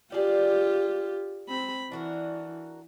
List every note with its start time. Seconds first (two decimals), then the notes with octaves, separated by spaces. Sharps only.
0.12 F4 G4 G#4 D5
1.49 C4 B5
1.92 E3 D4 F#4 A#4